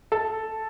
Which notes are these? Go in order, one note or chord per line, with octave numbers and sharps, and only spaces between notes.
A4